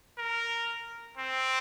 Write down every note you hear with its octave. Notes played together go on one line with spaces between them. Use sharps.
A#4
C4